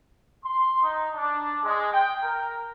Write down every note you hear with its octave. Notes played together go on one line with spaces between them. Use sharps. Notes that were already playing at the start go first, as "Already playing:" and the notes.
C6
D#4
D4
G#3
G5
A#4